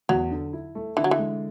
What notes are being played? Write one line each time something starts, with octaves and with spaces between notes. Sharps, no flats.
E2 F#3
D3
E4
A3
D3 E3
F#3
E3
G#3